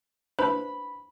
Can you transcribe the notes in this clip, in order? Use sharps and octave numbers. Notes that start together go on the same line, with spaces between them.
D4 B4 C5 B5